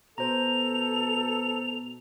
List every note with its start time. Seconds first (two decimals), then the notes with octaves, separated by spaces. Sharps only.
0.18 B2 A4 C5 A#5 F7